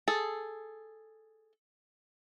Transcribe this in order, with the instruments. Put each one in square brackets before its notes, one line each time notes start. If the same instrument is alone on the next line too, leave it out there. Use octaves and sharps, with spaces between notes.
[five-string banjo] G#4 A4